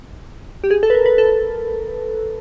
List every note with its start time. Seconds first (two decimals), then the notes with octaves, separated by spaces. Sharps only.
0.64 G4
0.71 G#4
0.83 A4
0.90 B4
0.95 A#4
1.06 B4
1.18 A4